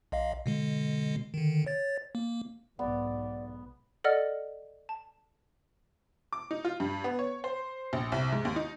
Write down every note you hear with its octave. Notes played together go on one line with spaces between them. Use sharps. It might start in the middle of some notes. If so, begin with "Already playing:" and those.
B1 D#5 F5
B2 D3 G#3
D3 D#3
C#5 A6
A#3
B1 G#2 B3 D5
A4 D5 D#5 F#5 E6 F6
A5
D6
D#4
F4
G2
B3
C#5
C5
A#1
C2
G#2
D#2
D#4